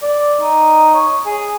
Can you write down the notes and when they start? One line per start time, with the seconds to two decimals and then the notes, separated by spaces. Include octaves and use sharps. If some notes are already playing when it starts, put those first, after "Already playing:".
0.03 D5
0.41 D#4
0.94 C#5
1.26 G#4